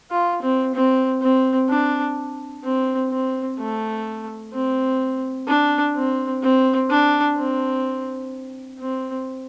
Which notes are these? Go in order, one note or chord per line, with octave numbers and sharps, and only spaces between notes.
F4
C4
C4
C4
D4
C4
C4
A3
C4
D4
C4
C4
D4
C4
C4